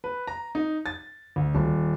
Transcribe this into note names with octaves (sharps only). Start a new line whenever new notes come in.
B4
A#5
D#4
A6
D2
D#1